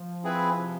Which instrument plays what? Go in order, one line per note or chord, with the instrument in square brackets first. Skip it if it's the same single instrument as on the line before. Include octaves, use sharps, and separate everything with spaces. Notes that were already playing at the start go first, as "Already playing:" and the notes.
Already playing: [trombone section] F3
[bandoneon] C4 E4 G#4 B4
C3